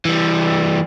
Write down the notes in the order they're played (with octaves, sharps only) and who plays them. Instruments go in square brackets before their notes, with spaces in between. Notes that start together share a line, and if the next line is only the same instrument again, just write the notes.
[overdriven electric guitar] E3 G3